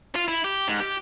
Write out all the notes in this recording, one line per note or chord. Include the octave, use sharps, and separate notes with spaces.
F4
E4
G4
G#2
G4